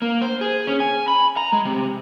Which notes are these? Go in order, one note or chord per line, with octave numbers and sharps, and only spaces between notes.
A#3
C5
G#4
C#4
G#5
B5
A#5
G#3
C3